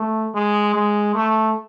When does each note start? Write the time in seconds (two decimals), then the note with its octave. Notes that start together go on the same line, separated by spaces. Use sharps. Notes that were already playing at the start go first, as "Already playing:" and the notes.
Already playing: A3
0.34 G#3
0.74 G#3
1.15 A3